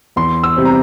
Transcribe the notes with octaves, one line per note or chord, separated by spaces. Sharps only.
E2 C6
E6
C3 G3 C4
A#5